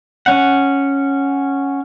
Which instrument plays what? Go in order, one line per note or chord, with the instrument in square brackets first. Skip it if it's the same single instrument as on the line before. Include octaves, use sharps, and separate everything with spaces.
[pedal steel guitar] C#4 F#5